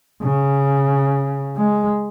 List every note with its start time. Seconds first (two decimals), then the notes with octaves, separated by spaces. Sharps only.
0.22 C#3
1.57 G#3